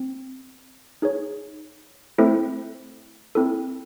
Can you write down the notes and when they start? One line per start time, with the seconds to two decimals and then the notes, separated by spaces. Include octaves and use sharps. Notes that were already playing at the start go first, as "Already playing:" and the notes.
Already playing: C4
1.02 D#4 G#4 C#5
2.18 A3 C4 E4 A4 C5
3.35 C4 E4 A4